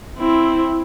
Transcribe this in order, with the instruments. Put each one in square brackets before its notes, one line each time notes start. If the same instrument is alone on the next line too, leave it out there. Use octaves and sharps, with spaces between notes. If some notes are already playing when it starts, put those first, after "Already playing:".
[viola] C4 E4